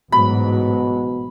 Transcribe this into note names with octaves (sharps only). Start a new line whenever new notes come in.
A1 G#2 B2 F#3 B5